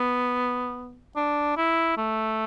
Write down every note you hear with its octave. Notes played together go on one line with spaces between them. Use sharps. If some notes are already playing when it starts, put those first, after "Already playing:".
Already playing: B3
D4
E4
A3